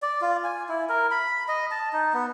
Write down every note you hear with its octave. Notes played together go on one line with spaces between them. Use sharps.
D5
F4
G#5
E4
A#4
B5
D#5
A5
D#4
B3